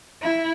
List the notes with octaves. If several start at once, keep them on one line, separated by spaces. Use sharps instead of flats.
E4